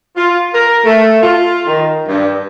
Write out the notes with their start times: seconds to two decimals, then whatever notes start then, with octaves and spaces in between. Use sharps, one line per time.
0.16 F4
0.53 A#4
0.84 A3
1.22 F4
1.66 D#3
2.07 G2